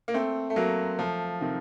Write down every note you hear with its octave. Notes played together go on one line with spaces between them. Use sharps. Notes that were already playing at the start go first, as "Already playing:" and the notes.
A#3
A3 C4
A3
F#3 A#3
F3 A3
C3 D#3